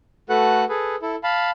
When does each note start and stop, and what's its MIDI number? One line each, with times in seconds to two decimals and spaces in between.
0.29 0.64 57
0.29 0.64 66
0.29 0.64 69
0.29 0.64 71
0.29 0.64 78
0.29 0.64 90
0.69 0.96 68
0.69 0.96 69
0.69 0.96 71
1.02 1.15 64
1.02 1.15 69
1.23 1.50 77
1.23 1.50 81
1.23 1.50 83